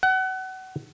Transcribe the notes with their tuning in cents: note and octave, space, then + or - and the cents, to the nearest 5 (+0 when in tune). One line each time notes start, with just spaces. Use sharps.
F#5 +30